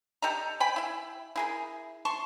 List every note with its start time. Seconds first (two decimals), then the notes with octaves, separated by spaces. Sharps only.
0.22 G4 A4 D#5 A#5
0.60 G5 G#5 B5
0.76 E4 E5
1.36 E4 G#4 A#4
2.05 A5 C6 C#6